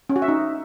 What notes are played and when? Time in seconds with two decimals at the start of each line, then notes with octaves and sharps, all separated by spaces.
0.09 C#4
0.16 F#4
0.22 E5
0.28 D#4